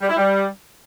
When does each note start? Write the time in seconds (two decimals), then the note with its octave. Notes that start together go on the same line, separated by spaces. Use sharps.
0.02 G3
0.09 E4
0.17 G3